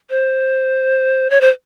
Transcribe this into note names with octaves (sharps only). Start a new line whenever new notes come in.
C5
C#5
C5